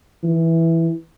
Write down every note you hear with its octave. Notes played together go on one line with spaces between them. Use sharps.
E3